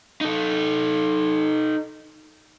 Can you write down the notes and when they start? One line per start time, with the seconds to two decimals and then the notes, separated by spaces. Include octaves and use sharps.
0.21 D#4 A4